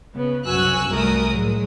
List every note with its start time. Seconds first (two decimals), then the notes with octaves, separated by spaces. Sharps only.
0.14 C#3 B3
0.46 C2 F#2 F#4 G#5 E6 F#6
0.90 C2 G3 A3 A#4 D#6
1.31 A2 F#3 G#3